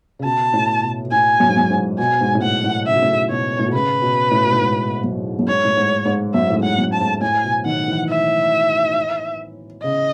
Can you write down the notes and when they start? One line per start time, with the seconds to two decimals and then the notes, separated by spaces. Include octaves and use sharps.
0.19 C#3
0.24 B2 A5
0.54 A2
0.83 B2
1.04 B2
1.12 A2 G#5
1.40 F#2
1.49 G#2
1.57 F#2
1.70 G#2
1.99 B2 G#5
2.21 G#2
2.35 A2
2.42 G#2 F#5
2.64 A2
2.86 C#3 E5
2.94 B2
3.03 A2
3.11 B2
3.30 B2 C#5
3.59 A2
3.66 B2
3.73 C#3 B4
4.02 B2
4.31 A2
4.44 B2
4.52 A2
4.61 G#2
5.04 F#2
5.39 F#2
5.47 G#2 C#5
5.65 A2
5.77 G#2
6.05 G#2
6.34 F#2 E5
6.50 A2
6.57 G#2
6.63 F#5
6.78 F#2
6.93 A5
7.00 G#2
7.21 A2 G#5
7.44 B2
7.66 D#3 F#5
7.88 E3
8.09 E5
9.83 C#3 D#5